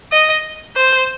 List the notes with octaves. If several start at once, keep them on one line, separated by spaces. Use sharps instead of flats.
D#5
C5